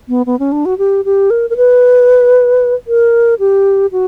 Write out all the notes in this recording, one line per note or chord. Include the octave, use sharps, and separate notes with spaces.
B3
B3
C#4
D4
F#4
G4
G4
A#4
A#4
B4
A#4
G4
F#4